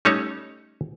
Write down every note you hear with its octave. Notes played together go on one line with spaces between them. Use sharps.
G3 A3 C#4 D#4 A4 C#5